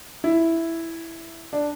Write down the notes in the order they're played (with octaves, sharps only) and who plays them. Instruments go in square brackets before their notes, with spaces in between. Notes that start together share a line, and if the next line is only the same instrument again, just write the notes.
[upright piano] E4
D4